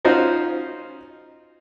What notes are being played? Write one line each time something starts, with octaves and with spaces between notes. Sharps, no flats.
C#4 D#4 F4 F#4 C5